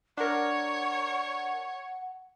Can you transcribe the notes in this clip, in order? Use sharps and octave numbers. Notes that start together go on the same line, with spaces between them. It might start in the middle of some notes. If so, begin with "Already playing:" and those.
D4 A#4 C#5 F#5